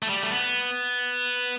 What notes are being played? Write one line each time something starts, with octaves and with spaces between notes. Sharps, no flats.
A3
G3
A3
B3